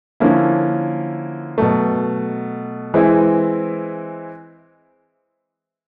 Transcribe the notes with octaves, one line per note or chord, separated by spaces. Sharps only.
D3 F3 A#3 C#4 E4
B2 F#3 A3
E3 G#3 C4 E4